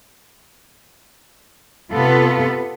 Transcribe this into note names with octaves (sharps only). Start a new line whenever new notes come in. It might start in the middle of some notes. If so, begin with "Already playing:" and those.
C3 B3 F4 A4 B4